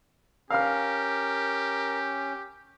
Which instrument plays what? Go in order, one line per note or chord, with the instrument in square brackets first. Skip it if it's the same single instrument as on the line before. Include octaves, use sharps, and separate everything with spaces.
[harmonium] C#4 [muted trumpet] G4 [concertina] A#4 [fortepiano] F5 F6